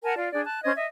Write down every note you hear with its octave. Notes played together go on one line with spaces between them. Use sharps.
A#4 F#5 G#5 A5
F4 D5 F5
D4 G#4 D5
A5 F#6
C#4 C5 D#5 G#6
D#5 E5